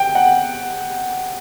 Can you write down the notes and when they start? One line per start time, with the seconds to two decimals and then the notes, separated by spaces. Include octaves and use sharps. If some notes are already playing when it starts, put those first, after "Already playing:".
Already playing: G5
0.15 F#5